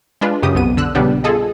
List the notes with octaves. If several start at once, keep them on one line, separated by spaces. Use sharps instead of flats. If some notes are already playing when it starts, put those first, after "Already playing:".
G#3 D4 F4 B4
F#2 C#3 G4 D#6
B1 F2 B3 D#7
D3 E6 F#6
A#1 C#3 G3 B3 D4 G4
F4 G#4 A4 D#5